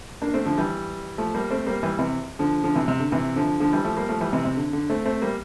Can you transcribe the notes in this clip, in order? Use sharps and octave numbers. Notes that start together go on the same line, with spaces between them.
A#3 D4
A3 C4
D3 F3
E3 G3
F3 A3
G3 A#3
A3 C4
G3 A#3
E3 G3
C3 E3
D3 F3
D3 F3
C3 E3
C3
D3
C3 E3
D3 F3
D3 F3
E3 G3
F3 A3
G3 A#3
F3 A3
E3 G3
C3 E3
C3
D3
D3
A3 C4
A3 C4
G3 A#3